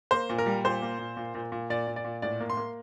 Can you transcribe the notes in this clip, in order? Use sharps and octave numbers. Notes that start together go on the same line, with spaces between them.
A#3 C5
A#2
A#4
G3
A#2 C5
A#3
A#2
A#2
A#2
A#2
A#2 D5
A#2
D5
A#2
A2 D5
A#3
C6
A#3